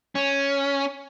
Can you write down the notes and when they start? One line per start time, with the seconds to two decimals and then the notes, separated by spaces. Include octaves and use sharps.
0.15 C#4